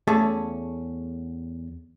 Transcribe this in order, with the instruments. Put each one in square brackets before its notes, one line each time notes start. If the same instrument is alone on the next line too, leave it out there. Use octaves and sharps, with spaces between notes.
[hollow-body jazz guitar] E2 A3 C#4 G#4 A5